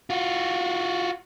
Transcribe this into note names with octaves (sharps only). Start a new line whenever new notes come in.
F4 F#4